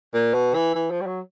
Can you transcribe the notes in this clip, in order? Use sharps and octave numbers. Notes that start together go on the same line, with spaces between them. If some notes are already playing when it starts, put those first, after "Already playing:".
A#2
B2
E3
E3
F3
G3
F#3